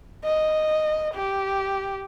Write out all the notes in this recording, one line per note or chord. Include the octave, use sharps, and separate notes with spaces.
D#5
G4